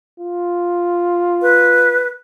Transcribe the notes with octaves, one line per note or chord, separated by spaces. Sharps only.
F4
B4